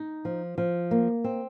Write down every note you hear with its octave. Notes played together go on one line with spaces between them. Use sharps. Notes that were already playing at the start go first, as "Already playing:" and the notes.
Already playing: D#4
F3
F3
A#3
C4